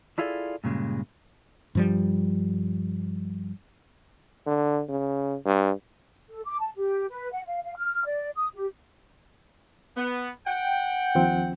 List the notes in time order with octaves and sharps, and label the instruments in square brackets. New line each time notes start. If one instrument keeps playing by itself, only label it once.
[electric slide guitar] D4 E4 F4 G#4 A4 D5
G2 A#2 C#3 G#3
[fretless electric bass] G2 F3 G3
[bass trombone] D3
C#3
G2
[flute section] A4
D6
A5
G4
B4
F#5
F5
F5
F6
D5
D#6
G4
[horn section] B3
F#5 G5
[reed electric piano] D#2 F3 C4